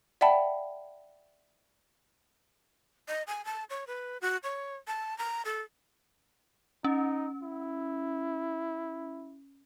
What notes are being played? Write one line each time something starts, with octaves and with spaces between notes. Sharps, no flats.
D5 E5 F#5 G5 A5 B5
D#5
G#5
A5
C#5
B4
F#4
C#5
A5
A#5
A4
C#4 D#4
E4